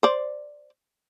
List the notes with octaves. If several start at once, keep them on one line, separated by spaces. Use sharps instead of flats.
C5 D5